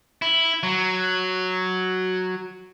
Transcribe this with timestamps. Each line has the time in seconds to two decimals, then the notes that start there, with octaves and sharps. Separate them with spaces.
0.22 E4
0.63 F#3